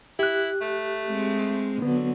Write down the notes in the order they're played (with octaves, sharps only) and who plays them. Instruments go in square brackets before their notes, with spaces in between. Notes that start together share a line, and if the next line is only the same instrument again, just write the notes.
[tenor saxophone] E4 [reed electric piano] G4 F#6
[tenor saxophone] A3
[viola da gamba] G#3 C4
[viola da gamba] D3 F#3 [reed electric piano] B3